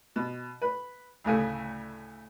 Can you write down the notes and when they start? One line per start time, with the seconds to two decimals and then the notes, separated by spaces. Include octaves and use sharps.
0.16 B2
0.62 B4
1.24 D2 A2 C#3 A3